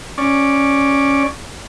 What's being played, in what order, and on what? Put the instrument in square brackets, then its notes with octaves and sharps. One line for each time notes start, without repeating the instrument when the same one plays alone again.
[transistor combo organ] C#4 D5